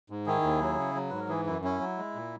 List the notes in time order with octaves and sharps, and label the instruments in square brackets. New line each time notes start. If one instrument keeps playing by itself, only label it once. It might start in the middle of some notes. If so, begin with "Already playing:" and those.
[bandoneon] G#2
[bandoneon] D#3 [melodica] E4 G#4
[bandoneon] D#2
F#3
C#3
F#3
[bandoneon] G#2 [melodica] B4
[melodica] A#4
[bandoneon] E3 [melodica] E4 G#4
[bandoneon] F#2 [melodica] E4
[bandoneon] C#4 [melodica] E4
[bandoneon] F#3
G#3
A#2